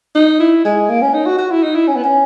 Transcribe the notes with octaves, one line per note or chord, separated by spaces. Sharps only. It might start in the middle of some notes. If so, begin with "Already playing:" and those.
D#4
E4
G#3
A#3
C#4
D#4
F#4
F#4
E4
D#4
E4
C#4
B3
C#4